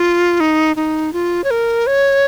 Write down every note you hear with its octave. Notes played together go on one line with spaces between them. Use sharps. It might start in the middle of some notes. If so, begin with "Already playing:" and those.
Already playing: F4
D#4
D#4
F4
C#5
A#4
C#5